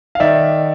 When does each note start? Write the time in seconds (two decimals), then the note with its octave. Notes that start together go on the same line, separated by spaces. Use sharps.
0.15 F5
0.20 D#3 D5 E5